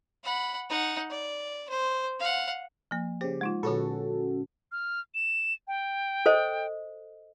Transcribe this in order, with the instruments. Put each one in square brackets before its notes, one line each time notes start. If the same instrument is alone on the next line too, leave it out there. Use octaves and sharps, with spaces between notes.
[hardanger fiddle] F#5 B5
D#4 F#5
D5
C5
F5 F#5
[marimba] F3 A#3
[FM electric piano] C#3 G4 [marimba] C5
[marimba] G#3 D#4 F4
[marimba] A#2 D3 [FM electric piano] C#4 F#4 A4
[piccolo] F6
E7
G5
[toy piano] A4 C5 D#5